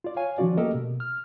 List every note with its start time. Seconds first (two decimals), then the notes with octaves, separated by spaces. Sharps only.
0.04 F4 D5
0.16 C#5 F5 G#5
0.38 D#3 F3 C#4 F4 F#4 D5
0.58 A3 A#3 G4 A4 A#4 D#5
0.74 B2
1.00 F6